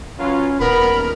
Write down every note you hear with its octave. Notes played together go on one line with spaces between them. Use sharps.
F#3 C#4 F4 B4
D#1 B3 A#4 B5